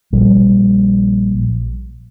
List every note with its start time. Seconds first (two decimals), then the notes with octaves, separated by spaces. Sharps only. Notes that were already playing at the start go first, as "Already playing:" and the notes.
0.13 A#1 G3